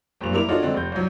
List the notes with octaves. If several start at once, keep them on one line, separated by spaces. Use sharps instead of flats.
F#1 G2 A#2 F7
G3 A#3 E4 A#4 D6 F7
D4 D#4 F4 F#4 A4 C#5
D3 G#3 C4 D4
F1 G6
C2 F#3